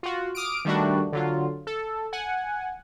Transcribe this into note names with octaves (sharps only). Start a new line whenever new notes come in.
F4 F#4
D6 D#6 F6 D7
D#3 G3 A3 D4 F#4
D3 F#3 F4
A4
F#5 G#5